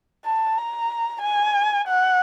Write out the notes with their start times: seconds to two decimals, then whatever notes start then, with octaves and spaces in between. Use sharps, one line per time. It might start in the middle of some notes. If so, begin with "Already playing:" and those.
0.25 A5
0.58 A#5
1.23 G#5
1.87 F#5